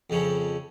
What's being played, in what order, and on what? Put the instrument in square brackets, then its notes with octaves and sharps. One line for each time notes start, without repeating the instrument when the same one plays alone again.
[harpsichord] F2 C#3 F3 C#4